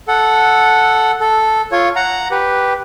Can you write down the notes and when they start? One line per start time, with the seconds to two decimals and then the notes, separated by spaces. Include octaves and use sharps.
0.08 A4 F#5
1.21 A4
1.72 F4 C#5
1.96 F#5 A#5
2.31 G4 B4